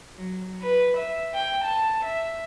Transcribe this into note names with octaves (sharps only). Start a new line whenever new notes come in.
F#3
B4
E5
G5
A5
E5